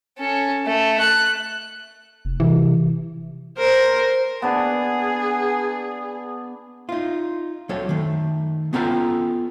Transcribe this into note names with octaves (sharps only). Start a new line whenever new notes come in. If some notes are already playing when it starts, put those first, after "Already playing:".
C#4 A4
A3
F#6
F1
C3 E3
A#4 C5
B3 D4 G#4
D#4 F4
F#3 A4 C#5
D#3 A3
B3 C#4 F4 A4 G5 A#5